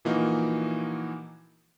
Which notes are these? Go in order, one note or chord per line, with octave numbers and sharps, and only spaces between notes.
A#2 E3 F3 A#3 D#4 F#4